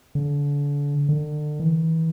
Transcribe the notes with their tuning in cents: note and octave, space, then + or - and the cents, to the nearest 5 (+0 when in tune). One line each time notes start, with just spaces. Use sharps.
D3 -35
D3 +35
E3 -30